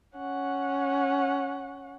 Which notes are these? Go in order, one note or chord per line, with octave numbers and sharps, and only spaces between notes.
C#4 F#5